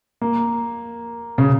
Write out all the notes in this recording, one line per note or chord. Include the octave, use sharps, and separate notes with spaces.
A#3
C#3